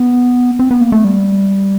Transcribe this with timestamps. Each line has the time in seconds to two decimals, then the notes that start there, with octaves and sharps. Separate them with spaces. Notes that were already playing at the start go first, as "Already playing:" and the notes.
Already playing: B3
0.59 C4
0.71 B3
0.81 A#3
0.92 A3
1.04 G3